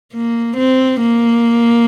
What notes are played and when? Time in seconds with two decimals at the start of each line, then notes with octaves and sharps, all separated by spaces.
0.13 A#3
0.57 C4
1.01 A#3